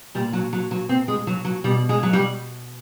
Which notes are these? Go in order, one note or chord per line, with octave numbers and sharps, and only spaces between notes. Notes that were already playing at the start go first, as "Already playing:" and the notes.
A#2 G3
F#3
F#3
F#3
C4
G#3
F#3
F#3
B2 G3
G#3
F#3
G3